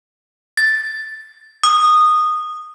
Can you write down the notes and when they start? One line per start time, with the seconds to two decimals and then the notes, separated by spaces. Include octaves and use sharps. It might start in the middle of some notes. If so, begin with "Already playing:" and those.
0.57 A6
1.63 D#6